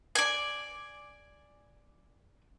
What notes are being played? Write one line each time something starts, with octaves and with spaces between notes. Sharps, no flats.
D5 G#5